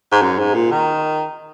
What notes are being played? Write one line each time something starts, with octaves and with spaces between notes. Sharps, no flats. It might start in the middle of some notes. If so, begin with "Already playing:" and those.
G#2
F#2
G#2
A#2
D#3